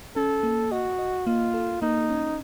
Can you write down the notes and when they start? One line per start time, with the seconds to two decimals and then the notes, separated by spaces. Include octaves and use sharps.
0.16 C#4 A4
0.43 A#3
0.71 F#4 D#5
0.99 D#5
1.26 A#3 F4
1.54 A4
1.82 A#3 D#4
2.10 C#4